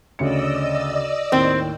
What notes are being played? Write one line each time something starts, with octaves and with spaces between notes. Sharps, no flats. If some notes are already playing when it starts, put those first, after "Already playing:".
D2 C#3 D5 D#5 E6 C#7
D#2 A2 C4